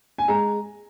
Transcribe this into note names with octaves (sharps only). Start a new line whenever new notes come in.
G#5
G#3 A#5